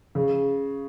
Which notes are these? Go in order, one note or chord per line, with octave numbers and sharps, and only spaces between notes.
C#3